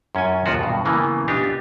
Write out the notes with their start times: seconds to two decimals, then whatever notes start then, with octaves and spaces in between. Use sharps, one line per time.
0.15 F#2 C#4 F4 G#5
0.46 D#2 F3 F4 F#4
0.59 G2 B2
0.85 C#3 E3 A#3 B3
1.28 B3 D4 D#4 F4 G4